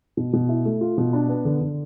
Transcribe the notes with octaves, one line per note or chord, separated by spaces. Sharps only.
B2
B2
E4
A3
F4
B2
D4
B3
D3
D3